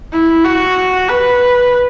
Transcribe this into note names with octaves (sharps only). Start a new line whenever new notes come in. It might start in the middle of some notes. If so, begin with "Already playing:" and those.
E4
F#4
B4